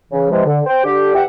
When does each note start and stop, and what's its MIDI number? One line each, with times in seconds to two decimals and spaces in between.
0.10 0.29 49
0.10 0.29 52
0.30 0.43 48
0.30 0.43 52
0.30 0.43 53
0.30 0.43 56
0.45 0.60 50
0.65 0.81 72
0.65 0.81 79
0.84 1.11 50
0.84 1.11 67
1.14 1.23 40
1.14 1.23 67
1.14 1.23 76
1.14 1.23 78